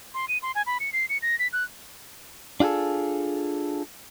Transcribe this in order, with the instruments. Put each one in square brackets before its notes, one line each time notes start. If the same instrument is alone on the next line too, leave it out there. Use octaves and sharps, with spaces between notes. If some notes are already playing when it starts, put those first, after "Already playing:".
[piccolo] C6
D#7
C6
G#5
B5
C#7
C7
C#7
A#6
B6
F#6
[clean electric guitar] D4 F4 F#4 G#4 A4